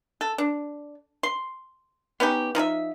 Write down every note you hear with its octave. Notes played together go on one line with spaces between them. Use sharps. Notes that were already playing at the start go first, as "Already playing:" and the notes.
A4
D4
C6
B3 C#4 D#4 G4
F3 D#4 G#4 E5